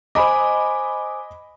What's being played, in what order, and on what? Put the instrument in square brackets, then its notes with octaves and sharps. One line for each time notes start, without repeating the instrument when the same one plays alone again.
[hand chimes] C5 G#5 D6 [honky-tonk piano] D#5 B5